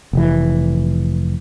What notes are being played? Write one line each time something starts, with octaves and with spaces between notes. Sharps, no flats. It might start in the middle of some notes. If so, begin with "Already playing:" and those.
F1 E3